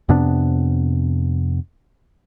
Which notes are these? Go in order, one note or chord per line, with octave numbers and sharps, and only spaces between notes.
F2 C3 B3 D4